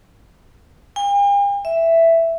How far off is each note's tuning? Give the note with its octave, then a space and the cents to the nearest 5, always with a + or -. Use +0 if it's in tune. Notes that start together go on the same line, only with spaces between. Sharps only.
G5 +45
E5 +5